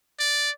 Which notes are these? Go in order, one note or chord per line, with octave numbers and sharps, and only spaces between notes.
D5